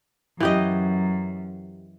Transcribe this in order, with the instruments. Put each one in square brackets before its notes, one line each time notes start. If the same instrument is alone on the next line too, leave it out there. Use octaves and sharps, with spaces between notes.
[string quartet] F#2 [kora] E3 G4 D#5